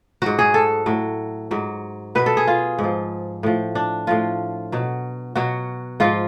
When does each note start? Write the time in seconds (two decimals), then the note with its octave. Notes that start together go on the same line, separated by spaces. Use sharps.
0.22 G#2 F#3 F#4
0.39 G#4
0.54 A4
0.86 A2 F#3
1.51 G#2 F#3
2.15 B2 F#3 B4
2.26 A4
2.37 G#4
2.47 F4
2.79 G#2
2.84 F3
3.43 A2 F3
3.75 D4
4.07 A2 F3 F4
4.72 B2 F#3
5.36 B2 F#3 F#4
6.00 G#2 F3 F4